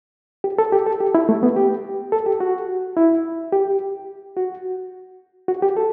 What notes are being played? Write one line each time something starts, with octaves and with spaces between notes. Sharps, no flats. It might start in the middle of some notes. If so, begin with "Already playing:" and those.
G4
A4
G4
A4
G4
E4
A3
B3
G4
A4
G4
F#4
E4
G4
F#4
F#4
G4
A4